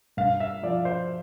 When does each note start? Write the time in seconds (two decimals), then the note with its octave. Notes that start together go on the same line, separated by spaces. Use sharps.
0.17 G2 F5
0.40 E5
0.63 F3 D5
0.85 C5